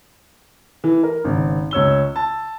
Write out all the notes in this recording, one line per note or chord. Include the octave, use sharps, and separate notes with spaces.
E3
A#4
G#1 C#3
C#2 C#5 E6 G7
A5